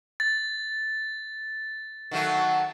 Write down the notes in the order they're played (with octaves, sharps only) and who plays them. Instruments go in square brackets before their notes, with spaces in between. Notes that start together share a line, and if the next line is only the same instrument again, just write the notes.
[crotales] A6
[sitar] D#3 F#3 A3 [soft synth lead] F#5